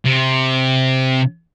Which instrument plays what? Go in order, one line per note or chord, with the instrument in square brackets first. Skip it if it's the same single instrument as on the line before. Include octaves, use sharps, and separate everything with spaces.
[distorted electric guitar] C3